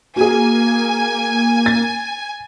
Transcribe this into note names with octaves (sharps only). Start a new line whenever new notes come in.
A#3 F#4 G#4 G#5
A6